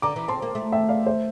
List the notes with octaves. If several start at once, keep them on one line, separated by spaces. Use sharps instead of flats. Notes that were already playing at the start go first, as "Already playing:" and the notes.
D3 A#5 D6
E3
C4 A5 C6
A#3
A3
E5 G5
D5 F5
C5 E5